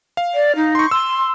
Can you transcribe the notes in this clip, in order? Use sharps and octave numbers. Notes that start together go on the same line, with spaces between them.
F5
D5
D#4
C6 C#6
C6 E6